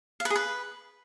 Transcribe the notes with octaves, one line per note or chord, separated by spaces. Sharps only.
F5
B4
G#4
B4